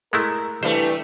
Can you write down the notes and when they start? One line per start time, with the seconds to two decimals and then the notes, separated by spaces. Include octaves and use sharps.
0.13 G#3 A3 E4 A#4
0.63 E3 G3 A3 D4 C5